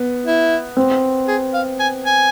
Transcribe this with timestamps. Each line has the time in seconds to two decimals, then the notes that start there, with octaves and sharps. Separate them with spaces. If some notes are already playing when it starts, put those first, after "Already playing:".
Already playing: B3
0.25 E4
0.77 C4
1.28 G#4
1.54 F5
1.80 G#5
2.06 G#5